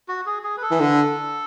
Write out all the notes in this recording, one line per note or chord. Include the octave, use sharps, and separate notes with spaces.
F#4
G#4
G#4
B4
A4
E3
D3